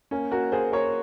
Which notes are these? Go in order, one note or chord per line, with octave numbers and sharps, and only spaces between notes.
A#3 C#4
A#3 F#4 A#4
A#3 G#4 C5
A#3 A#4 C#5